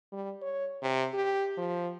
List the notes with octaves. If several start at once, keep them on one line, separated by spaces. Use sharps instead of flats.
G3
C#5
C3
G4
F3